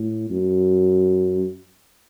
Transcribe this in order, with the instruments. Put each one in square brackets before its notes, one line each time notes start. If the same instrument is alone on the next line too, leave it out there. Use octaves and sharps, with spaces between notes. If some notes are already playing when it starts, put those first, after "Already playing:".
Already playing: [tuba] A2
F#2